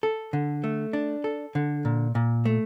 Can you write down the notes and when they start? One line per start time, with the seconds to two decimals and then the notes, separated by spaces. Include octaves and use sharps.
0.03 A4
0.33 D3
0.64 A3
0.93 D4
1.24 A4
1.55 D3
1.85 A#2
2.15 A#2
2.45 A3